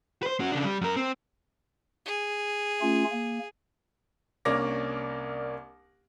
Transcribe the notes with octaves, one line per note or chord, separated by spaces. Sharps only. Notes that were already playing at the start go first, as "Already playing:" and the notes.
B4 C5
C#4 F#4
C#3 D4
G3
F#2 A#4
C4
G#4
A3 C#4 F4
A#3
C2 A#3 C#4 D4 D6 A#6